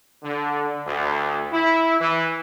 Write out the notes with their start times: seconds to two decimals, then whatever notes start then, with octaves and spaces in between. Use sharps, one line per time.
0.23 D3
0.87 D2
1.52 E4
2.00 E3